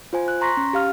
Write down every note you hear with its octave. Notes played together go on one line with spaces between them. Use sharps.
F4 C5 G#5
F#6
A#5 C6 C#6 A#6 B6
C#4
G4 F5 F6